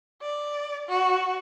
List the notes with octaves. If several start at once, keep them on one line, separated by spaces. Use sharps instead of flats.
D5
F#4